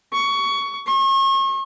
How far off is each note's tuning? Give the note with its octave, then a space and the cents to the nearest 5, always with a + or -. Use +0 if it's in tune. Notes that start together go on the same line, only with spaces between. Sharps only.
C#6 +20
C#6 -40